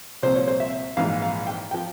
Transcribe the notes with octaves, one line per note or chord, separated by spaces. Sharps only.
C2 A#2 F3 C5
C#5
C5
E5
A#1 G#2 E3 F5
F5
G5
F3 G5